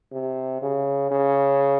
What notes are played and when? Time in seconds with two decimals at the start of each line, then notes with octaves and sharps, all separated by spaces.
0.12 C3
0.61 C#3
1.11 C#3